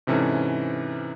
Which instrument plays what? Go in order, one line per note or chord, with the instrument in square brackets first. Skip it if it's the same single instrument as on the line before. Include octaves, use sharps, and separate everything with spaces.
[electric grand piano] G#2 C3 E3 C#4 A4